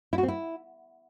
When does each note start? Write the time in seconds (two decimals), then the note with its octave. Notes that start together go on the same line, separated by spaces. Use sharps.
0.13 E4
0.18 F#4
0.23 C4
0.28 E4